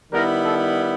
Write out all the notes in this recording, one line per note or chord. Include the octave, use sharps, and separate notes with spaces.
D#3 G3 B3 E4 A#4
A4